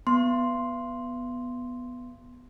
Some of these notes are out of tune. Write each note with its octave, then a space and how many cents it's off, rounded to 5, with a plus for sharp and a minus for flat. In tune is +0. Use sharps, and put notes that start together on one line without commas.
B3 +0 C6 +0